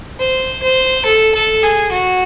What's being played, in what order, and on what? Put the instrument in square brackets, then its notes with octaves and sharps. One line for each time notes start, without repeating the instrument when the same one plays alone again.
[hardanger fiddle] C5
C5
A4
A4
G#4
F#4